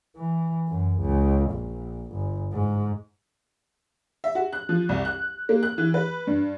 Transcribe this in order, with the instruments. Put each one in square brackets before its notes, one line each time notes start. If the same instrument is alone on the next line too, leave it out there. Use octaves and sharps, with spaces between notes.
[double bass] E3
F#2
C#2
A#1
G1
G#2
[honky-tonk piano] E5
F#4
F#6
F3
C2
F#6
A#3
F#6
E3
B4
G2